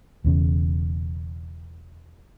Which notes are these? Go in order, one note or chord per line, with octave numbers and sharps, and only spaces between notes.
E1 E2 C#3